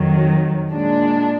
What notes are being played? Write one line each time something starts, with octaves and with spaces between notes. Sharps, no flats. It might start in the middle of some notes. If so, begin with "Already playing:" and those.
Already playing: F2 D#3 F#3
A#2 G#3 D4